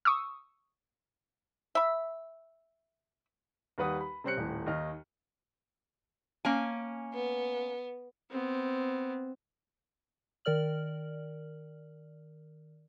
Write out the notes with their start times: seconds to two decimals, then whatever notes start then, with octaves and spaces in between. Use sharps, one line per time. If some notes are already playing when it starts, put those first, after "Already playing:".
0.05 C#6 D#6 E6
1.75 E5 B5
3.78 D#2 G3 B4 F#5 D#6
4.01 B5
4.24 C3 G3 C4 C#4 F#6 C#7
4.37 D#1 A2
4.66 D#2 D#3 D#5 F6
6.45 A#3 C#4 G#5
7.13 B3
8.31 B3 C4
10.45 D#3 A#4 D5 F6 F#7